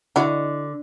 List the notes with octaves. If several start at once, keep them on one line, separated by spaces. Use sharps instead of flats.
D3 E4 F#4 D#5